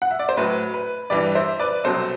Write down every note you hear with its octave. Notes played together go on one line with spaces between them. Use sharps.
F#5
E5
D5
C5
A2 F#3 B4
B4
G2 E3 G3 B4 D5
C5 E5
B4 D5
C2 B2 F#3 A4 C5